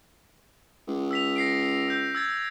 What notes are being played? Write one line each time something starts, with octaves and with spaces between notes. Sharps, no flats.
C#2
E6 B6 F7
A#6 C7 D7
E6 G6
E6 G#6 A6